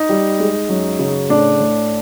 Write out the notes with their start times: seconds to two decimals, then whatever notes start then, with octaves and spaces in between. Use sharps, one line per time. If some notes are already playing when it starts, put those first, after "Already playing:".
Already playing: D#4
0.09 G3
0.39 G#3
0.69 F#2
0.99 C#3
1.29 A2 D4
1.60 A2